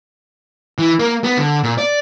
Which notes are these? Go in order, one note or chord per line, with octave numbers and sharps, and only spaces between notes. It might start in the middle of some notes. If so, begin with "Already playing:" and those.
E3
A#3
B3
D3
A#2
D5